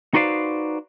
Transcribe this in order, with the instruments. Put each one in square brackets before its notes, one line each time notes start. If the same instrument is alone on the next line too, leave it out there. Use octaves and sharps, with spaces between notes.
[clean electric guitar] D#4 F#4 B4 C5 D5 F5